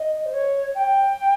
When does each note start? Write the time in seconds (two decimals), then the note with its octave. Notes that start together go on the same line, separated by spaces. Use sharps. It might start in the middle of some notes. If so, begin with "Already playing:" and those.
Already playing: D#5
0.26 C5
0.33 C#5
0.75 G5